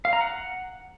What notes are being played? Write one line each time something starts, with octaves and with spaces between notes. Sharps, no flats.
F5
A#5
F#5